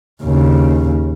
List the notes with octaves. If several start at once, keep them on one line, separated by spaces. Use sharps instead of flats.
D#2 C#3